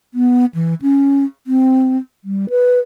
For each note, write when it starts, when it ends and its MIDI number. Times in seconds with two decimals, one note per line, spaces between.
0.14 0.45 59
0.55 0.74 52
0.82 1.24 61
1.47 1.97 60
2.24 2.49 55
2.50 2.79 71